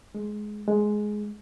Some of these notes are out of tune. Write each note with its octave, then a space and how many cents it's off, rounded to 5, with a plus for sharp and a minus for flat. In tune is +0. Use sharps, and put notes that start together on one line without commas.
G#3 +15
G#3 +10